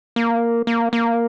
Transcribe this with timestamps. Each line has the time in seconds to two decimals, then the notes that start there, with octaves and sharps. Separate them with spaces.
0.16 A#3
0.67 A#3
0.93 A#3